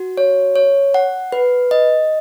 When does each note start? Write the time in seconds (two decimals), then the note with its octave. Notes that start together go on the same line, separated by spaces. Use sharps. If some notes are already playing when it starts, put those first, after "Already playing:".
Already playing: F#4
0.17 C#5
0.56 C#5
0.94 F#5
1.32 B4
1.71 D#5